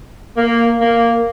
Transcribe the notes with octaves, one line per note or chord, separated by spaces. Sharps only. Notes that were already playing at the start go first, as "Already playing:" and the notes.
A#3
A#3